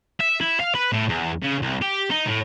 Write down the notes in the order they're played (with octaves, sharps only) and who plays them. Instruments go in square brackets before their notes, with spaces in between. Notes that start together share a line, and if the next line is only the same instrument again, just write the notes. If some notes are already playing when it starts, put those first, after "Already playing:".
[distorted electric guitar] E5
E4
F5
B4
A2
E2
C#3
C2
G4
D#4
A2